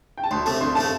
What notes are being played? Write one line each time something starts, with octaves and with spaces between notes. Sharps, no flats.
G5
A5
D2 C6
C3 A3 A5
D2 C6
C3 A3 A5